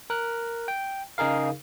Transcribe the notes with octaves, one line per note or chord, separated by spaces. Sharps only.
A#4 F#6
G5
C#3 D#4 G#4 A#4 F5